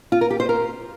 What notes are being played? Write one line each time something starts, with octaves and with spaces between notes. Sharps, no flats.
F4
A#4
G4
C5
A#4